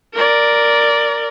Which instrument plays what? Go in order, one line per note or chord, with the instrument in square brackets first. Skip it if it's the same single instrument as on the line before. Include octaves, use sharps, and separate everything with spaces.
[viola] A#4 D5